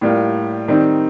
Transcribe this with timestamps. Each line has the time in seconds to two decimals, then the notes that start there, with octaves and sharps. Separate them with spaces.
0.01 A2 G3 A#3 F4
0.68 D#3 G3 C4 D#4